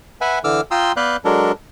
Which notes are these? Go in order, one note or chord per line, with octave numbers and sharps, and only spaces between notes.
B4 E5 F#5 G#5
D3 E3 D6 E6 F6
F4 G5 A#5 C6 D#6 E6
B3 B4 D5 F5 F#6 G6
F#3 G#3 D4 A4 A#4